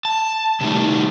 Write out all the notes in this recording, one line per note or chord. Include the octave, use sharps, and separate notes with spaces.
A5
C3 D#3 G3 A3 D#4